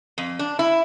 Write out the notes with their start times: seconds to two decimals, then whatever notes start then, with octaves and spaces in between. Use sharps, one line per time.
0.18 F2
0.39 D4
0.59 E4